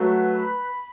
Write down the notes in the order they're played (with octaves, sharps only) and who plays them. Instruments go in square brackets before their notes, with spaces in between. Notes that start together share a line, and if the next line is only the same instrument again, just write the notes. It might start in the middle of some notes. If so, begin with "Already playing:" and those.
Already playing: [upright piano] F#3 A3 [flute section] B4 F#5
[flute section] B5